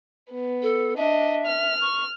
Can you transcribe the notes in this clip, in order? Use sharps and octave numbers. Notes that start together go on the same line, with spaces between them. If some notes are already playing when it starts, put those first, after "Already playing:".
B3
A4
D4 D#5 E5
F6
C#6